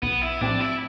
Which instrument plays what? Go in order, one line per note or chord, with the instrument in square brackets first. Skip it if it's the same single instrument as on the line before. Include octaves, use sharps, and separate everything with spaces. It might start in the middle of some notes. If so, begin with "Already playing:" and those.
[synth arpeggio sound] B1 [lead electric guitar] B3
[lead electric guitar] E4
[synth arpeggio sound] A2 F3 C4 G4 [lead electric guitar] D4
[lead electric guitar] E4